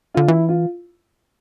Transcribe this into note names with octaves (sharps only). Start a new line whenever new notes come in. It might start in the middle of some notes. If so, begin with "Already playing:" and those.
D3 F4
E3 E4
F4